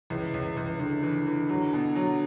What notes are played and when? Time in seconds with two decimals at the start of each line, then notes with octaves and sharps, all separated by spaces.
0.10 C#2 E3
0.34 C#2
0.57 C#2
0.79 C#2 D3
1.03 E3
1.27 E3
1.49 F#3
1.73 B2
1.96 F#3